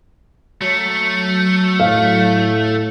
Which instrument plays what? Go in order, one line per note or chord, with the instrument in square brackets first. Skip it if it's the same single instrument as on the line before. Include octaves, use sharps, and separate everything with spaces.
[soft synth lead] F#3 [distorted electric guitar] A3
[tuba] A2 [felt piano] F5